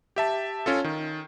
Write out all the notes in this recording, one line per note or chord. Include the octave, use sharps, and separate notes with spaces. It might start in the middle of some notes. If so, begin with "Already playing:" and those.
G4 E5 A5
C#4 F4 A4
D#3